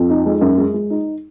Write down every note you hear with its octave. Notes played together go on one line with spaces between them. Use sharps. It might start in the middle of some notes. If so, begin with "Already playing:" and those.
Already playing: F2
D#4
G#3
F#2
G#3
G#3
D#4